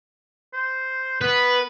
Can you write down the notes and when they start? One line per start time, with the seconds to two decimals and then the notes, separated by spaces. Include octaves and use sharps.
0.54 C5
1.21 B3 B4